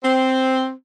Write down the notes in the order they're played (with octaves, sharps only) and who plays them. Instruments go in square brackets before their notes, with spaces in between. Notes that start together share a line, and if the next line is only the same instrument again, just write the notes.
[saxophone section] C4